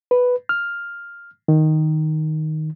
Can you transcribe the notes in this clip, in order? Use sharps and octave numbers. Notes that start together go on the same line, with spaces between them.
B4
F6
D#3